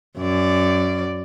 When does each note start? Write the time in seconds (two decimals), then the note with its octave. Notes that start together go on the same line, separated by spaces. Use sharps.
0.18 F#2 D5